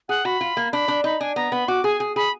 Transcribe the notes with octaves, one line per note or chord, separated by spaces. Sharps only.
G#4 F#5
F#4 B5
F4
A#3
D4 B5
D4
D#4 B5
D4 G#5
B3 A#5
B3 B5
F#4 D6
G#4 G#5
G#4
G#4 B5